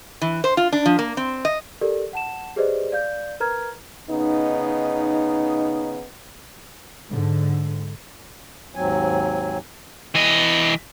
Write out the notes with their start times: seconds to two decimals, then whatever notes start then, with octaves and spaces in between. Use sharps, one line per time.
0.21 E3
0.44 C5
0.57 F4
0.72 D4
0.86 F3
0.99 A#3
1.17 C4
1.45 D#5
1.81 G4 A4 A#4 D5
2.13 F#5 A5 E7
2.56 G4 G#4 B4 C5 D5 D#5
2.92 D5 F5 G6
3.40 A#4 B4 A#5 F6 G#6
4.10 C#3 B3 D#4
7.10 G#2 D3
8.75 D#2 G#2 F#3 C4 G#5
10.15 E3 D#5